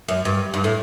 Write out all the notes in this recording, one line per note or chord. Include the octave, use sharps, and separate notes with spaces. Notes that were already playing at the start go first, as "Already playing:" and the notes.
F#2
G2
G2
A2